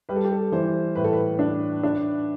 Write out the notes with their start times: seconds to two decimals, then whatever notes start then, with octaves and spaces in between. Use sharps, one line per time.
0.09 G3 B4
0.16 A4
0.25 G4
0.32 A4
0.52 E3 C5
0.95 A2 B4
1.04 A4
1.13 B4
1.39 D4
1.83 D4